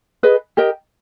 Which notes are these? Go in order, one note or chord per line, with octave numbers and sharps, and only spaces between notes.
G#4 B4 D#5
G4 A#4 D#5 G5